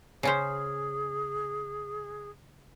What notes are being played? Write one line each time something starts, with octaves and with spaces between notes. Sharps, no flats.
C#3 C#4 G#4 C5